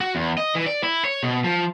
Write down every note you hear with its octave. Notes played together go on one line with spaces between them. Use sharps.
F#4
E2
D#5
E3
D5
E4
C#5
B2
F3